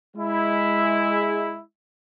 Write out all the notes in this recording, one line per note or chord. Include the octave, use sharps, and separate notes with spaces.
G#3 E4